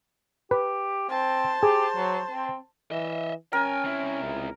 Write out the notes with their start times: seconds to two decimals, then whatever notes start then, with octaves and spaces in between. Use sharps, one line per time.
0.51 G4 B4
1.09 C4 C5 A5
1.63 G4 G#4
1.96 F#3
2.31 C4
2.91 E3 D#5 E5
3.53 C#4 A#4 G5 G#5
3.84 C3 E4
4.23 C#2